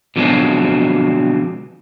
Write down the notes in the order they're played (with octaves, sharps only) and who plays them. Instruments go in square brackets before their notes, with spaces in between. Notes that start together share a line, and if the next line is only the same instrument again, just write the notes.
[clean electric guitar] B2 D3 F3 F#3 G#3 C4